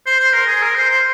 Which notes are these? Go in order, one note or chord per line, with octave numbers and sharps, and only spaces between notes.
C5
C5
A#4
G#4
A#4
C5
C5